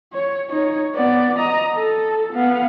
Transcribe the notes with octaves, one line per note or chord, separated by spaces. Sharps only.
C#5
D#4 C#5
B3 D5
D#5 A#5
A4
B3 F5